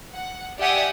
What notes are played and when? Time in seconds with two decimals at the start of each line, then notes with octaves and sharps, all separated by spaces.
0.14 F#5
0.59 G4 D5 E5 F#5 G#5 D#6